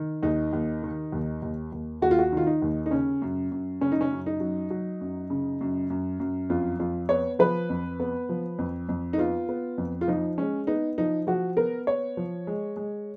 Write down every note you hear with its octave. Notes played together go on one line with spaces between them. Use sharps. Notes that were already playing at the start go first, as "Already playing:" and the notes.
Already playing: D#3
D#2 D#4
D#2
D#3
D#2
D#2
D#2
D#2 F#4
F4
F#4
D#3 F4
D#4
D#2
D#4
C#3 C#4
F#2
F#2
C#3 C#4
D#4
C#4
F#2
D#4
F#3
F#3
F#2
C#3
F#2
F#2
F#2
F2 F4
F2 F4
B3 C#5
F3 B4
F2
B3
F3
F2
F2
D#4
B3 F4
B3
F2
F4
F3 D#4
G#3 C#4
B3 D#4
F3 D#4
F3 F#4
B3 A#4
B3 C#5
F3
G#3
G#3